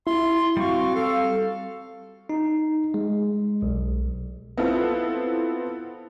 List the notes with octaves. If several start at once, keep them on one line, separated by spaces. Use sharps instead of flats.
E4 C6
G3 C4 F#4 F5 C#6
A4 F5
D#4
G#3
B1
B3 C4 E4 F4 A4